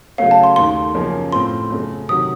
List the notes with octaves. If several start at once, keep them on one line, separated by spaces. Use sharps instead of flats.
C#3 F#3 A3 C#4 F5
A5
C6
D#2 D#3 A3 C6
F#2 C#3 F3 A#3 C#4
A2 A3 C4 F4 C6
F#2 C#3 A3
C3 D#3 F#3 D#6